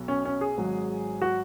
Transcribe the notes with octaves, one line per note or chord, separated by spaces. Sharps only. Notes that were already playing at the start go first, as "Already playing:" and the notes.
Already playing: B1 B2 F#3
C#4
C#4
G#4
G#1 G#2 F#3
F#4